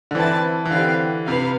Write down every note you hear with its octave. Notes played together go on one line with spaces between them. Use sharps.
D3
E3 C4 E4 B4 D5 A5
E3
D3 C4 G4 B4 F5
C3 B4 F5